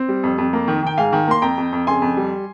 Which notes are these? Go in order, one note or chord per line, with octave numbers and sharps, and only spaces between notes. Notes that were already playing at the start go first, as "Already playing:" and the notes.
Already playing: C4
G3
F2
F2
A#3
D#3
D#3 G5
G#2 F5 G#5
D#3
A#3 C6
F2 G5 A#5
F2
F2
C#3 G#5 C6
F2
G3